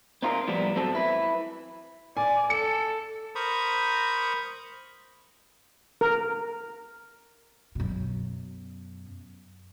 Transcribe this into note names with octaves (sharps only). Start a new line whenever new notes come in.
C4 D#4 F4 G4 A#4
A2 F3 G3 B3
A2 F#3 C4 A4
E4 B4
D5 G#5
A4 C#7
A#4 C5 A#5 B5 C#6 D#6
A#4
F#2 B2